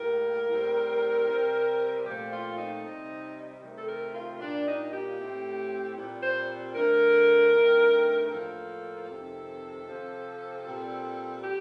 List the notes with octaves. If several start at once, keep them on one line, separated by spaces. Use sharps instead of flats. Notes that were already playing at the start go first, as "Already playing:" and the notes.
Already playing: A2 G3 A#3 A#4
A2 G3 C4
C3 G3 C4
A#2 F3 A3 C4 G4
F4
D#4
C3 G3 C4
C3 D#3 A3
A4
A#4
F4
A#2 G3 A#3 D4
D#4
G4
A2 A3 C4
A#2 G3 C4
C5
D3 A3 C4 A#4
G2 D#3 A3 C4
A2 F3 A#3 A4
F2 C3 D#3
C3 F3 C4
A#2 G3 C4
G4